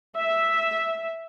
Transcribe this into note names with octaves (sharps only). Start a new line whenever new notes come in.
E5